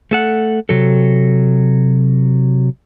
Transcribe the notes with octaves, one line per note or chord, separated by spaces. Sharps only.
A3 A4 F#5
C3 F#3 A4